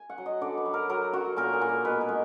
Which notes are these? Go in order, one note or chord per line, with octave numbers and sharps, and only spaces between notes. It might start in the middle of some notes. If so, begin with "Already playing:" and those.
Already playing: G#5
F#5
F#3
D#5
D3 D5
B4
F#3
A#4
F#3 A#4
F#3 F#4
A#2 A#4
G#4
A#2
A#4
B2 B4
A#4
G#3